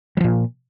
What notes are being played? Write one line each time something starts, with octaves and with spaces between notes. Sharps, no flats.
A#2 F3 F#3